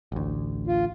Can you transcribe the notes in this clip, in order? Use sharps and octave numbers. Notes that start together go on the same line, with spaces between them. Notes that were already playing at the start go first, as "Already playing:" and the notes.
A1 D2
F4